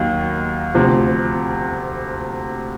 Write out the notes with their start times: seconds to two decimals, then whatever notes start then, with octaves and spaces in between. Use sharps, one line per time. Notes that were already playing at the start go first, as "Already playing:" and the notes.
Already playing: D#2 D#3 F#3 A#3
0.74 D2 C3 F3